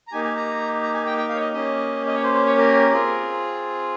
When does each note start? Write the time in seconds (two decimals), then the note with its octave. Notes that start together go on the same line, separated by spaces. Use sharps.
0.08 A#5
0.12 A#3 D#4 G4 G#5
0.24 G#5
0.36 A#5
0.83 A#5
0.94 G#5
1.06 G5
1.18 G5
1.29 F5
1.35 C#5
1.40 D#5
1.53 A#3 C#4 G4 D#5
2.07 D#5
2.15 C#5
2.23 C5
2.34 C5
2.46 C#5
2.58 A#4
2.93 C4 F4 G#4